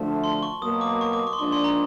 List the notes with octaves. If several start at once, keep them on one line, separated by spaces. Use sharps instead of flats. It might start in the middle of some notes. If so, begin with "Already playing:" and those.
Already playing: D2 D3 F3 A3 A5
C6
C#6
B2 F#3 A#3 D#6
D6
C#6
D6
C#6
C6
G#2 F3 A#3 D4 C#6
C6
A#5